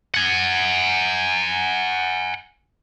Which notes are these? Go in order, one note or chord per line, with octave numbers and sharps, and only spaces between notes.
F#5 G#5